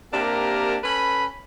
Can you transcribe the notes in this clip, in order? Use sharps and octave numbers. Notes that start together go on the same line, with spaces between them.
C3 A#3 D4 G4 A#4
C#4 A4 B4 B5